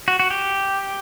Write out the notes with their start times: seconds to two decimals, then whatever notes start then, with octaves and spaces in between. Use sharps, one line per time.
0.08 F#4
0.20 F#4
0.30 G4